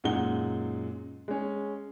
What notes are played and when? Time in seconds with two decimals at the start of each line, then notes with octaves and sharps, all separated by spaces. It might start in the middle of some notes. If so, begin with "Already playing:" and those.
0.04 F#2 A#2 G#3 D#4 F#5 G7
1.28 G#3 C#4